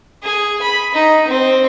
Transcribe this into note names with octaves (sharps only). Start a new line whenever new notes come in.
G#4
B5
D#4
C4